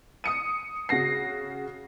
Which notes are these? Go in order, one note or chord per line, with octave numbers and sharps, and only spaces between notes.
D#6 C#7 D#7
C#3 F#4 A#6 C7